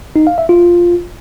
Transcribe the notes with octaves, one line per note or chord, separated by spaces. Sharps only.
D#4
F5
E5
F4